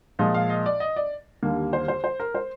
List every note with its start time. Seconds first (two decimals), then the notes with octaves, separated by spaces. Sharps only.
0.19 A#2 F3 G#3 D#5
0.34 F5
0.50 D#5
0.66 D5
0.80 D#5
0.96 D5
1.43 D#2 D3 G3 A#3
1.73 C5
1.88 C5
2.04 C5
2.20 A#4
2.35 C5